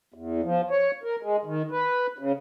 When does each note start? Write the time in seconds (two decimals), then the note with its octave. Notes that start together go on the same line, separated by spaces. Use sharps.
0.14 E2
0.43 F3
0.70 C#5
1.03 A#4
1.23 G#3
1.45 D#3
1.71 B4
2.18 C#3